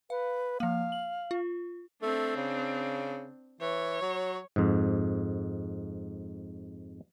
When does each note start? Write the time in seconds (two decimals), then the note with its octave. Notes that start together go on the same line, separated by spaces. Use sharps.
0.10 B4 F5
0.60 F3 A#3 F5
0.92 F#7
1.31 F4
2.03 A3 C4 D4
2.36 C#3
3.61 E3 C#5
4.02 F#3
4.56 F2 G#2